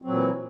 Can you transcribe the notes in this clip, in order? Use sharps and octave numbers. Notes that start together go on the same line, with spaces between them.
A#2 E3 F#3 C4